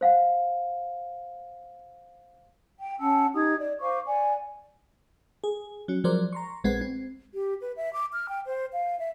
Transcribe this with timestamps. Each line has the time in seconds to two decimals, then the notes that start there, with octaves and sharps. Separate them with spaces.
0.01 C5 F5 F#5
2.79 G5
3.00 C#4 F#5 A5 E6
3.35 D#4 G4 D#6 G#6
3.60 D5
3.80 C5 F5 C#6 D6
4.07 D5 F#5 G#5
5.44 G#4
5.88 F#3 C#4
6.04 F3 F#3 G#3 A#4 C5 D5
6.33 A#5 C6 C#6
6.64 A#1 G#3 C4 B4 F#5 G#6
6.81 C4
7.34 G4
7.61 B4
7.77 E5
7.93 D6
8.13 F6
8.29 G5
8.46 C5
8.73 F5
8.99 E5